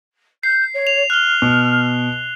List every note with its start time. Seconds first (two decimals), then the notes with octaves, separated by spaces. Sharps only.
0.43 G6 C7
0.74 C#5
0.87 F7
1.10 F6 F#6 G7
1.42 B2